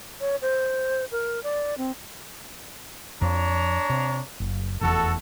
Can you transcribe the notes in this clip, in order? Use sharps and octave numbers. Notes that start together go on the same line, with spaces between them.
C#5
C5
A#4
D5
C4
F2 F3 D4 C#5 A#5
C3
F#1
F1 E2 F#4 A4